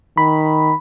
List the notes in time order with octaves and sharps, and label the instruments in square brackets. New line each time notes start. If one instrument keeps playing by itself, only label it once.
[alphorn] D#3 [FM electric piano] B5